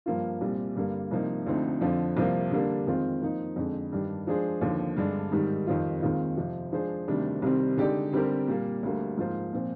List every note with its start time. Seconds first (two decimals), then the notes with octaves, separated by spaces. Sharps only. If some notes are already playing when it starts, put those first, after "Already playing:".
0.06 G2 F3 A#3 F4
0.41 C2 A#2 G3 C4
0.76 G2 D3 G3 A#3
1.11 C2 C3 F3 A#3 D#4
1.46 D2 D3 F3 C4 D#4
1.81 F2 D3 F3
2.17 C2 C3 F3 A#3
2.51 D3 G3 A#3 D4
2.87 F2 D#3 G#3 C4 F4
3.22 F3 A#3 D#4
3.56 F2 D3 G#3
3.92 G2 D#3 G3 D4 G4
4.27 F3 G#3 D4 G#4 C5
4.61 D#2 D3 F3
4.97 G2 D3 G#3 D4
5.32 G#2 D#3 G3
5.67 F2 D#3 G3 C4 F4
6.02 D#2 D#3 G#3 C4 F4
6.37 F2 C3 F3
6.72 F3 G#3 D4 G#4 C5
7.08 D2 C3 D#3 G3 D4
7.42 C2 C3 D#3 G3 C4
7.78 D3 G#3 D#4 G4 D5
8.12 D3 G3 C4 G4 A#4
8.47 A#2 G3 A#3
8.83 D2 D3 G3 A#3
9.17 G#2 F3 A#3 F4 C5
9.53 A#2 F3 C4